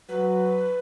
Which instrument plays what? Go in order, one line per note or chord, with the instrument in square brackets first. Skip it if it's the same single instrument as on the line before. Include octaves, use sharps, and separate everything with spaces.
[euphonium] F#3 [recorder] B4